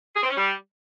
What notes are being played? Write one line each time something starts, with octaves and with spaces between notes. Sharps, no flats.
G#4
C4
C#4
G3